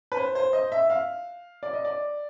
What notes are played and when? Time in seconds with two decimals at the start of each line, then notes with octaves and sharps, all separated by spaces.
0.12 B4
0.17 C5
0.35 C5
0.53 D#5
0.72 E5
0.90 F5
1.63 D5
1.73 D#5
1.85 D5